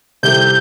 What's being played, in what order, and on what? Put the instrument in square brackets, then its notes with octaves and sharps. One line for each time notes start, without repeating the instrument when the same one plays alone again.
[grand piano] C3 G3 C4 E4 A4 [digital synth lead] G6